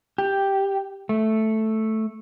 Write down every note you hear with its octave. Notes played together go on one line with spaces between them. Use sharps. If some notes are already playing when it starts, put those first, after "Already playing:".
G4
A3